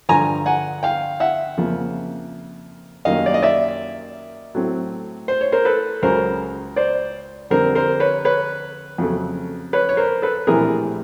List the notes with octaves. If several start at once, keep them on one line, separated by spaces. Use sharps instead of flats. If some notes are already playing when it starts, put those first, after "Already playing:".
G2 D3 F3 G#5 A#5
F#5 G#5
F5 G5
E5 F#5
F2 C#3 F3 A#3
F#2 D#3 G3 A#3 D#5 F5
D5
D#5
D5 E5
A2 F#3 A3 C4
C5
C#5
A#4 C5
A4 B4
C#2 C#3 F#3 A#4 C5
C5 D5
F2 D3 G3 C4 A#4 C5
A#4 C5
B4 C#5
B4 C#5
F2 C#3 F#3 A3
B4 C#5
C#5
A#4 C5
A4 B4
A#1 A2 E3 G3 C4 G#4 A#4